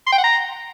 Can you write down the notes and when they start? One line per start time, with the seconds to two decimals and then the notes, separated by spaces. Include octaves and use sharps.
0.06 C6
0.12 G5
0.18 F#5
0.24 A#5